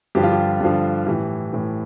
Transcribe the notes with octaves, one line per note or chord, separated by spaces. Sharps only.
G2 D3 F3 G4
F4
G4
G2 D3 F3
A2 E3 G4
A2 E3